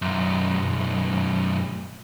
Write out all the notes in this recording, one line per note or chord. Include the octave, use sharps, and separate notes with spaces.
B1 F#2